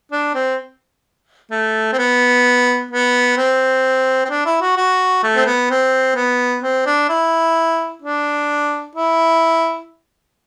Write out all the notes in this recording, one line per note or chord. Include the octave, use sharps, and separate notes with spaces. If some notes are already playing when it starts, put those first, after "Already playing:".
D4
C4
A3
C4
B3
B3
C4
C4
D4
E4
F#4
F#4
A3
C4
B3
C4
B3
C4
D4
E4
D4
E4